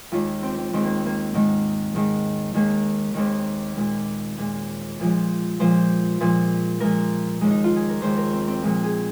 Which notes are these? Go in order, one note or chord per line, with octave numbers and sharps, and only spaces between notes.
D#2 D#3 G#3 F4
C4
C4
D#2 D#3 G#3 C4
A#3
A#3
G#2 D#3 G#3
G#2 D#3 G#3
D#2 D#3 G#3 A#3
D#2 D#3 G#3 C4
A#2 G#3
A#2 G#3
A#2 F3 G#3
A#2 F3 G#3 C5
A#2 F3 G#3
A#2 F3 G#3 A#4
D#2 D#3 G#3
D#4
F4
G#4
A#4
D#2 D#3 G#3 C5
A#4
C4
C4
A#2 F3 G#3 F4
G#4